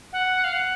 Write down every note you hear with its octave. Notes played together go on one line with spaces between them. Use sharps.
F#5
F5
F#5